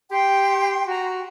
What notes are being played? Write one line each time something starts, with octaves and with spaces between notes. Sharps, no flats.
G4 G5 C6
F#4 A#5